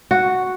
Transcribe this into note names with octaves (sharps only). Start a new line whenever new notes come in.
F#4